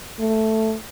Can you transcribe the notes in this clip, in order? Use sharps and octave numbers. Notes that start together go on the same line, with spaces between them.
A3